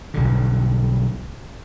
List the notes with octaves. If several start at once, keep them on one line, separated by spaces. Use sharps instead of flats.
B1 G2 D3